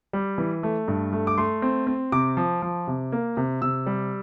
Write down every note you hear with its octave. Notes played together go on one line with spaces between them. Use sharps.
G3
E3
A3
G2
A3
D6
A3 C6
C4
C4
C3 D6
F3
F3
C3
A#3
C3
C3 E6
G3